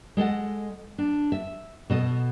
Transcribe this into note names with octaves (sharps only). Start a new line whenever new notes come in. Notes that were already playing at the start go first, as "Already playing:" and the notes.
G#3 A4 D#5 F#5
D4
E5
B2 A4 D#5